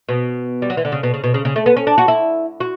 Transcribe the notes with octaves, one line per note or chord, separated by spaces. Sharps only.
B2
G3
F#3
E3
D3
C#3
B2
C#3
B2
C#3
C#3
A3
B3
C#4
D4
F#4
E4
F#4